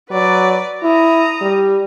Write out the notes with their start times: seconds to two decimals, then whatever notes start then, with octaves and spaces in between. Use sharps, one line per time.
0.11 F#3 B4 D5
0.83 E4 A#5 D#6
1.41 G3